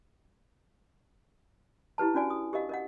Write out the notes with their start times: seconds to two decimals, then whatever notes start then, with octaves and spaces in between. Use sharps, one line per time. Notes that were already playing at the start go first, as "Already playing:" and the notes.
1.98 E4 G4 B4 A5
2.14 C#4 D4 F#4 D5 G#5
2.30 D#6
2.53 G4 A#4 D#5 F5
2.69 A#4 D#5 F#5